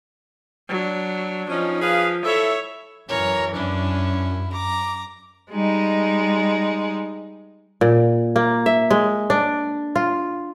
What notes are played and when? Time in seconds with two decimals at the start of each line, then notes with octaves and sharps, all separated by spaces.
0.68 F#3 D4
1.50 F3 C#4 D#4
1.82 G#4 B4 F5
2.25 E4 A4 C#5 E5
3.09 F#2 E3 A#4 C#5
3.55 F#2 C#4 D4 E4
4.53 A#5 D6
5.51 G3 G#3 D#4
7.81 A#2
8.36 A#3
8.66 E5
8.91 G#3
9.30 D4
9.96 F4